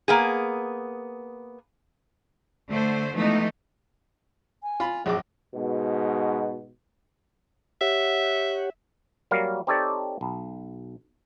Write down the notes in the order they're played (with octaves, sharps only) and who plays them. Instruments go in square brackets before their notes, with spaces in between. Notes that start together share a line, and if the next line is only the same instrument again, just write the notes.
[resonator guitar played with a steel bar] A#3 B3 G#4
[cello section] D3 A3 C5
E3 F3 G#3 A3 B3 D#4
[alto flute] G#5
[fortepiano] F4 B5
[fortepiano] A#1 F#2 D6 [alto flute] G#4
[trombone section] G#2 B2
[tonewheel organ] G4 C#5 F#5 [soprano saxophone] E5
[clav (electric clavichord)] F#3 G3 A#3 A#4 F5
C4 D#4 G4 A4 C#5 D5
B1